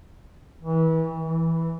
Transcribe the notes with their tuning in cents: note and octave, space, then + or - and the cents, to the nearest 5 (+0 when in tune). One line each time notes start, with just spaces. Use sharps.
E3 -30
E3 -5